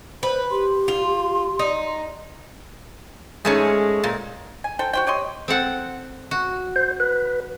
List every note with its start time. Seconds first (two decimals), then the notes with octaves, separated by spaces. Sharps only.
0.23 B4 C5
0.51 G4 C6
0.88 F4
1.59 D#4
3.45 G#2 G#3 A3 C#4
4.04 A#2
4.64 G#5
4.79 A4 C5 G5
4.93 F#4 C5 G5
5.07 G4 C#5 D#5 C6
5.48 C4 A4 F#5
6.31 F#4
6.76 C5
7.00 B4